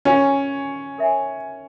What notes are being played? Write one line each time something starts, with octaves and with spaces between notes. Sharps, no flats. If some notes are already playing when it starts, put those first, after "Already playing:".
C#4 F4 A#4 C#5 F5 G#5
A#4 C#5 E5 G#5